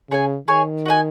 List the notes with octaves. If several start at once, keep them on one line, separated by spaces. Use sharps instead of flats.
C#3 G#4 C#5 G#5
D#3 G#4 C#5 G#5
F#4 D#5 G#5